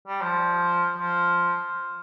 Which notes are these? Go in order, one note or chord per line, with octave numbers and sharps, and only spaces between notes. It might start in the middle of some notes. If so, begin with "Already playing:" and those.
G3
F3
F3